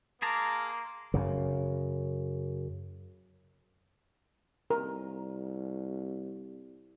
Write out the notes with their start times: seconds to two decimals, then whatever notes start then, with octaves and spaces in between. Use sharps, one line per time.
0.22 A#3 G#4 A5 A#5 C6 D6
1.14 F#2 C#3
4.70 C2 A#4